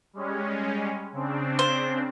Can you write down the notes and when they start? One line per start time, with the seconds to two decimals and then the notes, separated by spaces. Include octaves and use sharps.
0.13 G3 G#3 C#4
1.13 C#3 C4 D4
1.59 C5